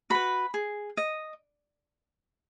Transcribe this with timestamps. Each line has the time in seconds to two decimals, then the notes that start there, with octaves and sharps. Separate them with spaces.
0.10 F#4 B4 B5
0.54 G#4
0.97 D#5